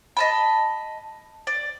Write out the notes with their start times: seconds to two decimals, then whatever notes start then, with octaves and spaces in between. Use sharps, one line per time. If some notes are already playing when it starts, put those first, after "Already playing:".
0.17 D#5 A5 B5
1.47 D5